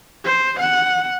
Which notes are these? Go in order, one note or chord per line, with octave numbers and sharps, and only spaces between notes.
C5
F#5